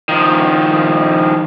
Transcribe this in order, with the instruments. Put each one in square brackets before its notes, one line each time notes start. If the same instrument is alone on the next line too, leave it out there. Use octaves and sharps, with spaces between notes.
[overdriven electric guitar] D#3 F3